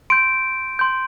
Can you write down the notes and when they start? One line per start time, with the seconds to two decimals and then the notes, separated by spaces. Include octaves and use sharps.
0.10 C6 G6 D7
0.79 C6 G6